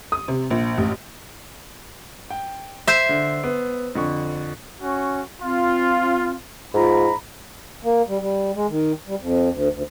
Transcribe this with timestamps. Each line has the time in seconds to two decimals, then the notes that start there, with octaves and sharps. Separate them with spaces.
0.12 D#6
0.28 C3
0.50 A#1
0.78 A1
2.30 G5
2.87 C5 E5
3.09 D3
3.44 B3
3.95 F2 D3 C#6
4.82 C#4 F#4
5.42 C4 F4
6.74 G#2 F4 A#5 B5
7.84 A#3
8.08 G3
8.20 G3
8.55 G#3
8.69 D#3
9.07 G3
9.21 F2
9.50 D2
9.71 D2